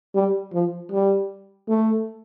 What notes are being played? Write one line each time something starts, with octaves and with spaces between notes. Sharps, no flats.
G3
F3
G3
A3